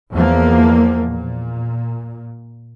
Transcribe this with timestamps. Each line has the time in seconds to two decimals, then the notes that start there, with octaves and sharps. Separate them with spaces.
0.13 E2 F3 A#3
1.09 A#2